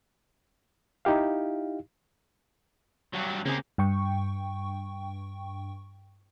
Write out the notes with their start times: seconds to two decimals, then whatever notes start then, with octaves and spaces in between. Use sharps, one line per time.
1.05 D#4 E4 G4 F5
3.14 G2 F#3
3.46 C#3 A#3 C4 G4 G#4
3.78 G2 G5 C#6